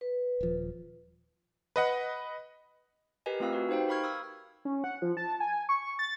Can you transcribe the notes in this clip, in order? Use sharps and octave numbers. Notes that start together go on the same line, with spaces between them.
B4
D#1 F3
B4 D#5 F#5
G4 A#4 B4 D#5 G#5
A3 C4 F4 A#4 F5 E6
F#4 B4
D#4 G4 C5 F5 G5
A#4 F5 B5 C#6 F6 G#6
D#6 E6 G#6
C#4
F#5
F3
A5
G#5
C#6
A6